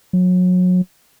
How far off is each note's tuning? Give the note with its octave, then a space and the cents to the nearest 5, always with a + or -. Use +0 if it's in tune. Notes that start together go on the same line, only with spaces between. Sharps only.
F#3 -30